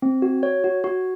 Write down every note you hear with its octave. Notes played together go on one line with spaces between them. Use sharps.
C4
F#4
C#5
F#4
F#4